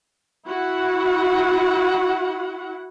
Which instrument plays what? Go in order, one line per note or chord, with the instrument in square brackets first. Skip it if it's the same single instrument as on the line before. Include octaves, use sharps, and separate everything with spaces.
[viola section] E4 F#4 F#5